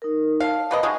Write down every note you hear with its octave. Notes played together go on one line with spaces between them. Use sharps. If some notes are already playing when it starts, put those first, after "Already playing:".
D#4 A#4
F5 A5
A#3 B4 D#5
F#3 G#3 D#4